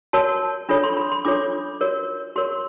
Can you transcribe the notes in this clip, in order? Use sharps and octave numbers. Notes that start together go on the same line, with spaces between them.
F#4 A#4 C#5 A5
D4 F4 A4 C#5 B5
C6
B5
C6
D4 F4 A4 C#5 D6
F#4 A#4 C#5
F#4 A#4 C#5 C6